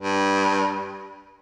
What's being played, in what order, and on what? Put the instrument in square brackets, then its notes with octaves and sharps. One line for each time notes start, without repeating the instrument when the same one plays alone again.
[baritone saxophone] G2